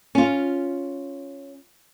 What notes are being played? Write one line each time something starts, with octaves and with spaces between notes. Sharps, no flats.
C#4 F4